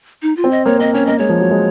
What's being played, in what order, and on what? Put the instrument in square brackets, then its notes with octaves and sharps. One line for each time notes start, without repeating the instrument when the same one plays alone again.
[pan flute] D#4
F4
[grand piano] C4
[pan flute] D#5
[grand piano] A#3 [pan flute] C#5
[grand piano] C4 [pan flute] D#5
[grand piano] C#4 [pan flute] C#5
[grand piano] A#3 [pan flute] D#5
[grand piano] G#3 [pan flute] C#5
[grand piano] F3
F#3
G#3